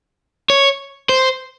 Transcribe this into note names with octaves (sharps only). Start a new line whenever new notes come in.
C#5
C5